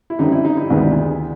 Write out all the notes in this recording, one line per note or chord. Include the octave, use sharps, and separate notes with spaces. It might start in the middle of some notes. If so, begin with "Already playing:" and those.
E4
F#2 D3 G3 C4 D#4
E4
D#4
E4
D2 C3 D#3 G#3 B3